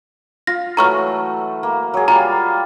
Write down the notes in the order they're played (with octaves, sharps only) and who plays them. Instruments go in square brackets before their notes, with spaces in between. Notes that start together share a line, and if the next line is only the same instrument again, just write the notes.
[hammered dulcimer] F4 [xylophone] A#6
[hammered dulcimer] E3 F#3 A3 [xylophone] A#5 C#6 F6
[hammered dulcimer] A#3
F#3 G#4
[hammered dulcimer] G3 A#3 F4 [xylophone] A#5